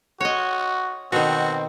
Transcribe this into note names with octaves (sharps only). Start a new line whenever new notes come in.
F#4 C#5 D#5
B2 D#3 C4 F#4